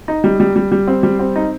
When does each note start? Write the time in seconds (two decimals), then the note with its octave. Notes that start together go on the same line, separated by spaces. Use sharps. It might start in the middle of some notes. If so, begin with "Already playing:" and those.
0.08 D#4
0.24 G3
0.40 G3
0.56 G3
0.72 G3
0.88 C4
1.03 G3
1.19 C4
1.36 D#4